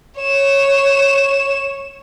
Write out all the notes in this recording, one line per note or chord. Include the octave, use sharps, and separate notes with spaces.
C#5 E7